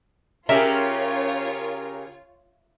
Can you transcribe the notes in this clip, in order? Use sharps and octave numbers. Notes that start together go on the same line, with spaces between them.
C#3 C#4 F4 G4 A#4 C#5 E5